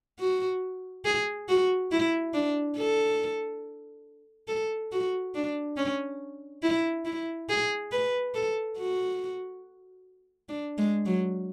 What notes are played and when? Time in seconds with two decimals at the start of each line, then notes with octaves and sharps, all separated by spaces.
0.20 F#4
1.05 G#4
1.49 F#4
1.92 E4
2.34 D4
2.77 A4
4.48 A4
4.92 F#4
5.35 D4
5.77 C#4
6.63 E4
7.05 E4
7.49 G#4
7.92 B4
8.35 A4
8.78 F#4
10.49 D4
10.78 G#3
11.06 F#3